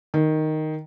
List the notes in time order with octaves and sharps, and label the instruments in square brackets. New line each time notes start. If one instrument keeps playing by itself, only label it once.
[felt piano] D#3